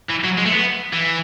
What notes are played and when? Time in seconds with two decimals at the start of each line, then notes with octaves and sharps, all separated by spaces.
0.10 E3
0.24 F#3
0.38 G#3
0.46 A3
0.52 B3
0.93 E3